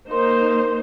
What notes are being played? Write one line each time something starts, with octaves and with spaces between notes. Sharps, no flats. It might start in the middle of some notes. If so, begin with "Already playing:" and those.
A#3 D#4 A#4 C5 C6